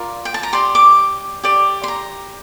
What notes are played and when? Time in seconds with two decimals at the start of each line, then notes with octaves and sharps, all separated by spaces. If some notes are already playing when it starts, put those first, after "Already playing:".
Already playing: F4 A#4 D5
0.25 G5
0.34 A5
0.43 A#5
0.53 G4 D5 C6
0.75 D6
1.44 G4 D5
1.84 C6
1.88 A#5